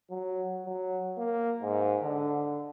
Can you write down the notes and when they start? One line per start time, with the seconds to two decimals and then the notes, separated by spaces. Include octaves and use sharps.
0.10 F#3
0.66 F#3
1.18 A#3
1.62 G#2
2.02 D3